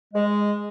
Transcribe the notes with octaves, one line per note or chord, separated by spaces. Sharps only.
G#3